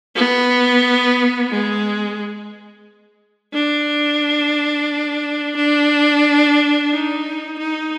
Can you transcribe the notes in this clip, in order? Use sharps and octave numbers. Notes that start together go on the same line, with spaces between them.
B3
G#3
D4
D4
D#4
D#4